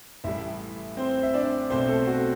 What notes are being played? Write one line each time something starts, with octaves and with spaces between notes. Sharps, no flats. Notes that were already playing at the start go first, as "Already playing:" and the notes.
A1 A2 G3 E4 E5
C4 C5
E5
D4 D5
B1 B2 A3 C4 C5
A3 A4
F#4